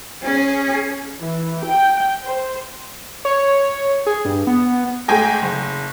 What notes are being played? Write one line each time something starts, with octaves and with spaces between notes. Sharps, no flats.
C#4 G#4
E3
G5
C5
C#5
G#4
G2
B3
G#2 A3 G#4 G5 G#5 A#6
F#1